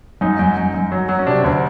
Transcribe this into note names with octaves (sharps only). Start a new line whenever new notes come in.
F#2 D#4
F#2
F#2
F#2
F#3
F#3
C#4
C3 D4
D2 D4